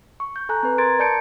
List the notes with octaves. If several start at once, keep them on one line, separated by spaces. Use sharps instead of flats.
C#6
G6
A4 G#5 A#5 F#6
C4 B4
A#4 A#5 C6 G#6 A6 D7
A#4 D5 A5 G6 C#7 D7